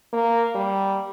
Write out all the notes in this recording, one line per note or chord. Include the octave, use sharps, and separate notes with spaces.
A#3
G3